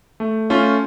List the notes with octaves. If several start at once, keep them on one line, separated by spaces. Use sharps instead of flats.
A3
A3 C#4 F4